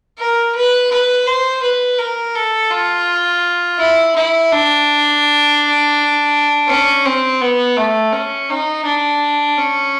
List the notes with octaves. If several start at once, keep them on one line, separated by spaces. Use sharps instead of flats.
A#4
B4
B4
C5
B4
A#4
A4
F4
E4
E4
D4
C#4
C4
B3
A3
C#4
D#4
D4
C#4